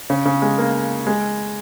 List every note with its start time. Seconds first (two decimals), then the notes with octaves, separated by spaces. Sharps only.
0.10 C#3
0.25 C#3
0.42 G#3
0.58 A#3
1.07 G#3